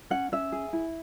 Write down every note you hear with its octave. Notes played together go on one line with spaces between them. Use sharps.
C#4 F#5
C#4 E5
G#4
E4